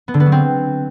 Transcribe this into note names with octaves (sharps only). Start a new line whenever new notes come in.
B3
D3
B3
F#3
C4